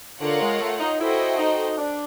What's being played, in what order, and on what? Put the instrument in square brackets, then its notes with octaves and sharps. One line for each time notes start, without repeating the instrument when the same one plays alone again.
[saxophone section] D3 [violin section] F4 A#4 C#5 F#5
[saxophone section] G#3
A3
D#4
[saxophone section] E4 [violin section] F#4 A4 C5 D#5 G5
[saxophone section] D#4
D4